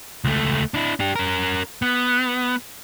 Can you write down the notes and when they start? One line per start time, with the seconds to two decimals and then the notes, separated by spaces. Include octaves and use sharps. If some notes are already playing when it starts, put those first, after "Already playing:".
0.24 C#2 A3
0.74 D4 E4
1.00 D4 G4
1.16 C#4 A#4
1.82 B3